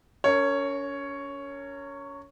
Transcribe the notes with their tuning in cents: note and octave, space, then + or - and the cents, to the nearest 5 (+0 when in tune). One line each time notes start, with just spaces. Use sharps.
C#4 +35 A#4 -30 C#5 +0